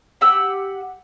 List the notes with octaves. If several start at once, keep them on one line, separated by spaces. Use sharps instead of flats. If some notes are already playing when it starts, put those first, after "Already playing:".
G4 F#5 E6